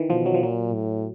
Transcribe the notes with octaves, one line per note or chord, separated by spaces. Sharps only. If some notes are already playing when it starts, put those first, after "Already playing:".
Already playing: D#3 E3
B2 F3
F#3
F3
A#2 F#3
A2